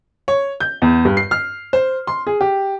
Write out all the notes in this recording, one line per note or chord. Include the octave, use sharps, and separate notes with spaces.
C#5
G6
E2
G2
C7
F6
C5
C6
G#4
G4